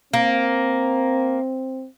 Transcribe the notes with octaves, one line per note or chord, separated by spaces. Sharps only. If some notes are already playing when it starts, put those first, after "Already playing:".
A#3 C4